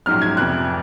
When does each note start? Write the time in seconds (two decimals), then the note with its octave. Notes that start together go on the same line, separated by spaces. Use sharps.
0.06 A#1 G#2 F#3 F6
0.22 G#6
0.37 F1 F2 C3 F#6